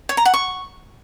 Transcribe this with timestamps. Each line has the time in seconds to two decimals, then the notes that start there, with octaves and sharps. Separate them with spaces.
0.09 C#5
0.17 A#5
0.25 F#5
0.34 C#6